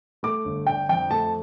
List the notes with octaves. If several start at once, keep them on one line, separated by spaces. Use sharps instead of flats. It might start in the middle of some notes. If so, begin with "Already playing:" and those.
A3 D6
G1
D3 G5
F2 G5
A3 A5